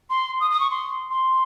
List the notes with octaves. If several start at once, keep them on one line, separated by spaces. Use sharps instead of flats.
C6
D#6
D#6
C#6
C6
C6